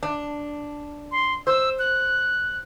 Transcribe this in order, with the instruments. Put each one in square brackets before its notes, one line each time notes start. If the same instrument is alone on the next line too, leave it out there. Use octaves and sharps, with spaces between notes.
[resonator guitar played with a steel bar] D4
[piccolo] C6
[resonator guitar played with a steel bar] C5 [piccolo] E6
[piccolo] F#6